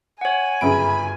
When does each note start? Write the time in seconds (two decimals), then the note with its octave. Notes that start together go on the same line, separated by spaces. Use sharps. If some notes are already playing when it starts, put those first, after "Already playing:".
0.21 C#5 F#5 G#5
0.61 G1 F#2 C#3 B5 D7